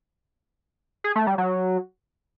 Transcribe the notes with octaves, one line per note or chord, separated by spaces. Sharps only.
G#4
A3
G3
F#3